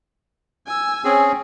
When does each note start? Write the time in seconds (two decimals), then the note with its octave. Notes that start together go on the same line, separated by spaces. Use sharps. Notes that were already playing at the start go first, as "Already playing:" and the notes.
0.67 G#5 E6
1.05 C4 C#4 G#4